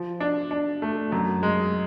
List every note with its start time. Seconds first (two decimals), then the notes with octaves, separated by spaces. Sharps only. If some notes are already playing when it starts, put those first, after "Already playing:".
Already playing: F3
0.20 D4
0.51 D4
0.82 A3
1.12 F#2
1.43 G#3